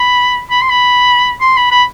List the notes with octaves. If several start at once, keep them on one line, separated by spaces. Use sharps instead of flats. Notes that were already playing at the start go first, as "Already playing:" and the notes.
Already playing: B5
B5
C6
B5
C6
B5
B5